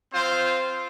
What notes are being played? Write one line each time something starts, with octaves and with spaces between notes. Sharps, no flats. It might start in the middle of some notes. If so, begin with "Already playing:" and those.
C4 F4 C5